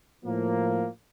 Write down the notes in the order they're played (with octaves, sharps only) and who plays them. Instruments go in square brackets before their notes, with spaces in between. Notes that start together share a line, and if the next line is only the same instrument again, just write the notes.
[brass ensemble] A2 F3 A#3